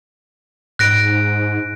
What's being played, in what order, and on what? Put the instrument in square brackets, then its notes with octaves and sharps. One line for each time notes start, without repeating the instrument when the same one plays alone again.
[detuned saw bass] G#2 [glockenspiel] F#6 A#6 D7